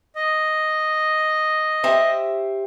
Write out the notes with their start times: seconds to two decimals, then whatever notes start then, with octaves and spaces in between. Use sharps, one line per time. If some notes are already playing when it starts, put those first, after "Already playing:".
0.16 D#5
1.83 G4 C5 E5